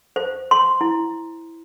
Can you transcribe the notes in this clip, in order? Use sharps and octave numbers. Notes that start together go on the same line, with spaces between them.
C5
C6
E4